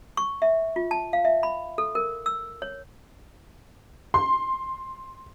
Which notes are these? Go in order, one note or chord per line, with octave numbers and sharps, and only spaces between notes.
C#6
E5
F4
A5
F5
E5
B5
A4
A#4
E6
C#5
C6